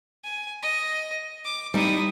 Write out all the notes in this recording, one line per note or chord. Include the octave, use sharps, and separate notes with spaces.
G#5
D#5
D6
G3 D#4 E4 D#6